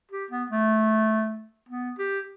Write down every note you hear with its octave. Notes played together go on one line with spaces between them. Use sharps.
G4
B3
A3
B3
G4